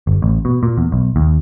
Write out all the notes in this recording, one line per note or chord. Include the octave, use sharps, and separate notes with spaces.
G1
A1
B2
A#2
E2
B1
D#2